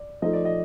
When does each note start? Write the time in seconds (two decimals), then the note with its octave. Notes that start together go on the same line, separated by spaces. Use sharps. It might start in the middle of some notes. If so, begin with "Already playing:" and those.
Already playing: D5
0.22 F3 A3 D#4 A4 D#5
0.33 D5
0.45 D#5